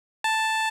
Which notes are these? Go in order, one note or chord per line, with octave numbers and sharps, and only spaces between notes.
A5